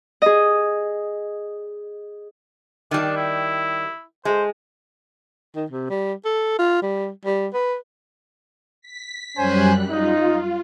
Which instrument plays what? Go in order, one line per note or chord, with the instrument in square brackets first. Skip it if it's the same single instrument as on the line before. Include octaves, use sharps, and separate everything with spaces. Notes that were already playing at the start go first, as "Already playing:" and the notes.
[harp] G#4 D#5
[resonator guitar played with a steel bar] D#3 G3 [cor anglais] D4
[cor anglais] E4
[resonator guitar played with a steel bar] G#3 [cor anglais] C5
[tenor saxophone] D#3
C3
G3
A4
F4
G3
G3
B4
[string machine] B6
[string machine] F#2 G3 F#6 [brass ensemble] C#4 C5 G#5
[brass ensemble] D#4 [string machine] F4